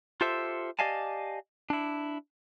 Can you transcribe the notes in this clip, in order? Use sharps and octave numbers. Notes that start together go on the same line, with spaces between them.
F4 G4 A4 C5 E5
G4 D5 D#5 F5 G#5 A5
D4 E4